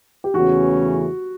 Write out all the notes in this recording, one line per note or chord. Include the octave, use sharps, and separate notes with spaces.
G4
E2 C#3 E3 A3 C#4 F#4